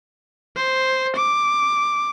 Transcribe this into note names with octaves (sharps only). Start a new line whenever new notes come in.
C5
D6